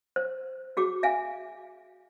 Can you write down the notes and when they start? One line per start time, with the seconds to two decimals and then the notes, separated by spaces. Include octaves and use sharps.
0.16 C5
0.77 F#4 G#4 D6
1.03 E5 F5 G#5